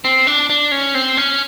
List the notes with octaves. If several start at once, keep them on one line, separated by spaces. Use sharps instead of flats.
C4
D4
D4
C#4
C4
C#4